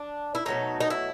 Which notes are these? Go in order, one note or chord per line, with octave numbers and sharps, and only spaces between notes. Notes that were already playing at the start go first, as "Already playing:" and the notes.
Already playing: D4
E4
B2 F#3 A3 D#4
D#4
E4